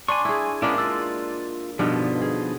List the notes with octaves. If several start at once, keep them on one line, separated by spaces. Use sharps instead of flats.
D4 G#5 C6 C#6
E4 G#4
G#3 A#3 B3 C#4 D4 E4
F4 D5 E6
G2 B2 D3 F3 B3 D#4
G#4